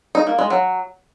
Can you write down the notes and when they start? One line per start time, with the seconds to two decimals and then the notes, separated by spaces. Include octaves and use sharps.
0.15 D#4
0.27 A#3
0.39 G#3
0.50 F#3